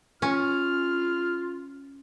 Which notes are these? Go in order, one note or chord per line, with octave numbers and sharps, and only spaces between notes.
C#4 F4 F6